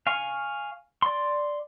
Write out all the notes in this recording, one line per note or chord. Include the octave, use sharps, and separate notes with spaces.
F5 G#5 C#6
D5 C6